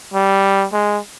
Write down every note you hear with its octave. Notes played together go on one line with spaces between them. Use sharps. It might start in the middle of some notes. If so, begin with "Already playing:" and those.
G3
G#3